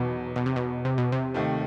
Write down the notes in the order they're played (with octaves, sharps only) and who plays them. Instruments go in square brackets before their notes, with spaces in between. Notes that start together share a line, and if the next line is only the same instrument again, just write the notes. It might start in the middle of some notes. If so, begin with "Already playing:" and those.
Already playing: [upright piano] E2 D#3 F#3 [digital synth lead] B2
[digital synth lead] B2
C3
B2
C3
B2
C3
[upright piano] D#2 D#3 A3